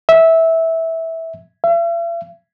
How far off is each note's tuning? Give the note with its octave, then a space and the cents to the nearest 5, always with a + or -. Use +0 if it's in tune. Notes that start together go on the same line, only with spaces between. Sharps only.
E5 -15
E5 +45